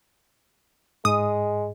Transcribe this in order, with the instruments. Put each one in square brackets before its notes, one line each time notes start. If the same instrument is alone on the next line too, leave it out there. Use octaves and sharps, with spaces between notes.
[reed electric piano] G#2 [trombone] G#3 [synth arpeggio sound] D#6